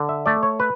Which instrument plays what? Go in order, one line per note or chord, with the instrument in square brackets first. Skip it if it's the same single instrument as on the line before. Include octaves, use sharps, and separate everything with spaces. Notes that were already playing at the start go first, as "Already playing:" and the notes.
Already playing: [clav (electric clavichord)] D3
E5
A3 D5
C#5
B4